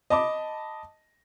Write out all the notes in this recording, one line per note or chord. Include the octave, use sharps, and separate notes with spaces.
D#5 A5 B5 D6